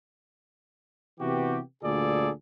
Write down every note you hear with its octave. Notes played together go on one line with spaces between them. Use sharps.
C3 E3 B3 F#4 G4
D2 A#2 D3 G#4 A4 D5